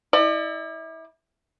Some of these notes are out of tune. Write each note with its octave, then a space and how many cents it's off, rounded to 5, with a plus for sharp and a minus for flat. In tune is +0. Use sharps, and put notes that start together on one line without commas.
E4 -30 D5 +35